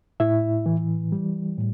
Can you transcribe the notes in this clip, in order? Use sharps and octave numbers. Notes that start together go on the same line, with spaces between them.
A2 E4 E5
E3
G3
A2